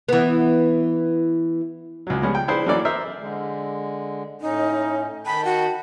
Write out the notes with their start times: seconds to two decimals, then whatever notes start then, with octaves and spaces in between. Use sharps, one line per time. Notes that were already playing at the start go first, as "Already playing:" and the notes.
0.09 E3 B3
2.07 C#2 F#3
2.22 F3 G3 G#3 B3 C#4
2.35 G5
2.48 D4 E4 G#4 B4 C5
2.66 E3 F#3 A#3 C#4 A4 D5
2.85 A#4 C5 D#5 E5
3.17 D3 G#3
4.41 A2 C#4 D#4
5.26 D#3 G5 A5 B5
5.45 F#4